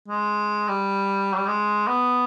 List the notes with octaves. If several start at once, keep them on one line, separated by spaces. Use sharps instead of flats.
G#3
G3
F#3
G3
G#3
B3